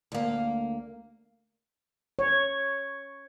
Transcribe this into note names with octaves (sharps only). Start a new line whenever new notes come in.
D2 A#3
C#5